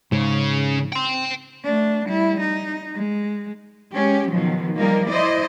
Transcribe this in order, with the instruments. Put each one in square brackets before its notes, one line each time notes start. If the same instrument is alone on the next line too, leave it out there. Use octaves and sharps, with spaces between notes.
[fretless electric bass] G#2 [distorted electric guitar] C#3
[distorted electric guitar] G5 C6
[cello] A3 D4
G3 E4
D#4
G#3
[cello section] G#3 C#4 G4
B2 D#3 F3 F#3
F3 G3 A#3 D#4 A#4
E4 C5 D5 D#5